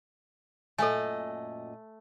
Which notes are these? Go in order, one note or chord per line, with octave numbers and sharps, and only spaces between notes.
F#2 A#2 A3 A4 D#5 G#5